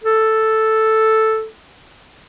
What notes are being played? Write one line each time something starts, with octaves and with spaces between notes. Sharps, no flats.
A4